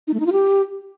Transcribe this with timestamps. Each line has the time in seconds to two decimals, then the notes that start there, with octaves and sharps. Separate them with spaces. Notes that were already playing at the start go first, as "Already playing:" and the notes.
0.07 D#4
0.14 A3
0.20 D#4
0.26 F4
0.32 G4